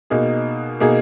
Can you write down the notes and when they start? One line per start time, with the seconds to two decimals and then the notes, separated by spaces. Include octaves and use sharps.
0.10 B2 A#3 D#4 G#4
0.80 B2 A#3 D#4 G#4